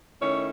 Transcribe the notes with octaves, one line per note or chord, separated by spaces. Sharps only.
D#3 A3 C#4 E4 C#5